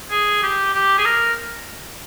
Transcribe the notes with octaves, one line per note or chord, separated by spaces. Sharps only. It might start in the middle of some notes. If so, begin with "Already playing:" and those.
G#4
G4
G4
G#4
A#4